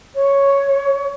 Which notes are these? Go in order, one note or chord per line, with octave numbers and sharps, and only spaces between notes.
C#5